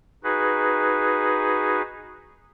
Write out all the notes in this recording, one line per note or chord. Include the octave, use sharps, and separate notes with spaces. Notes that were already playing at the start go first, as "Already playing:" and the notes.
D#4 F#4 G#4 B4